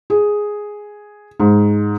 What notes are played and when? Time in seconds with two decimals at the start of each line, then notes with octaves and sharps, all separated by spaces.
0.10 G#4
1.40 G#2